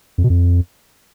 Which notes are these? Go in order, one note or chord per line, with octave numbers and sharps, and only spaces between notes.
F2
B2
F2